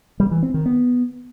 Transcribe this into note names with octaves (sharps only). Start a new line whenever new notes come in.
G3
E3
C4
D#3
B3